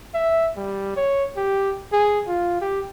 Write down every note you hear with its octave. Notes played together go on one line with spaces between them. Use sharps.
E5
G3
C#5
G4
G#4
F4
G4